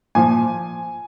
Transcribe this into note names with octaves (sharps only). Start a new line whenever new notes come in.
A#2 F3 G#5